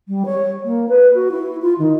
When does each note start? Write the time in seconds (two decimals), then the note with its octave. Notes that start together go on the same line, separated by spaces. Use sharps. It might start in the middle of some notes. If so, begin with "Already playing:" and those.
0.08 G3
0.26 C#5
0.64 A#3
0.89 B4
1.14 F#4
1.31 E4
1.62 F4
1.79 D#3